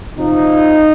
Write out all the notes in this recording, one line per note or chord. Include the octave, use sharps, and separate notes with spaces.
C3 F3 D#4